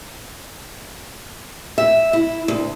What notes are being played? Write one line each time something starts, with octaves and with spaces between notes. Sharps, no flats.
E5
E4
D2